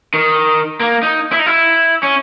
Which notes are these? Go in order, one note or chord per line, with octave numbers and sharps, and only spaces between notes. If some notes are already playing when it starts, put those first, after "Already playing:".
D#3
A#3
D#4
E4
D#4
E4
C#4